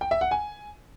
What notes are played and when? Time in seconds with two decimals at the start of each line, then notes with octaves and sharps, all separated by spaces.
0.01 G5
0.11 E5
0.21 F#5
0.31 G#5